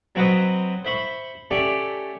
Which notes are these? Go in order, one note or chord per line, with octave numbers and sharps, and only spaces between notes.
F#3 C4 F#4 B4 C5 D#5
C5 E5 B5 C#6
A3 C#4 G4 D5